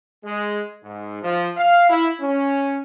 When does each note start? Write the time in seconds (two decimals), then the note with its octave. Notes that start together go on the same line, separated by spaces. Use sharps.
0.24 G#3
0.84 G#2
1.23 F3
1.57 F5
1.89 E4
2.21 C#4